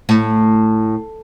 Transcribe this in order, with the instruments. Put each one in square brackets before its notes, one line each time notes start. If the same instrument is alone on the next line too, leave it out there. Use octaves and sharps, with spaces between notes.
[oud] A2